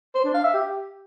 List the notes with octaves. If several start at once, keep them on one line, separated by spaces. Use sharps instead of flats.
C5
D4
F5
E5
G4